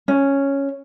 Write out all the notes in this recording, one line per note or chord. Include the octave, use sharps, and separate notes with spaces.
C#4